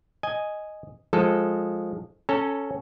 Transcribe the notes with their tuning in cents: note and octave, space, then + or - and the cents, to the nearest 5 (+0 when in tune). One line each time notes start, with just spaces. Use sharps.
D#5 +0 G#5 +0
F3 +10 G#3 +0 A4 +0
C#4 +0 A4 +0 A#5 -35